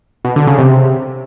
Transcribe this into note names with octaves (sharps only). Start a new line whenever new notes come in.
B2
D3
C#3
C3